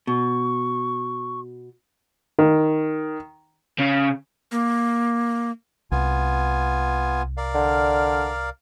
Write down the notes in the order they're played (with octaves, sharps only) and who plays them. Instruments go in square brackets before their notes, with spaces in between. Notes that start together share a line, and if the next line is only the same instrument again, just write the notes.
[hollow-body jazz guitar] B2 [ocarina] C#6
[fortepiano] D#3
[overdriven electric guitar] C#3
[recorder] A#3
[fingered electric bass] C2 [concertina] B3 F4 G#5
[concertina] A#4 D5 F5
[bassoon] D3